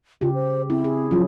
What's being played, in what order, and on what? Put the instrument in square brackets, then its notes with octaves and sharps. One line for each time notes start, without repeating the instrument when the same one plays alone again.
[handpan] C#3 G4 [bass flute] F4
[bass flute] C5
[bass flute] C4 [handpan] E4
[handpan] G#4
[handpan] F3 F#3 C#4 [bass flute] F4